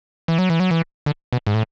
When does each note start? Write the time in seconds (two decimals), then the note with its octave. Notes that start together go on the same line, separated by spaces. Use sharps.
0.28 E3
0.39 F#3
0.50 E3
0.60 F#3
0.71 E3
1.06 D3
1.33 B2
1.47 G#2
1.54 A2